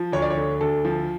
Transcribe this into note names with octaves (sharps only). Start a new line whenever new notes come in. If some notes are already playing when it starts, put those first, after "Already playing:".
Already playing: F3
D2 C#5
D5
C#5
D3
D2 A4
F3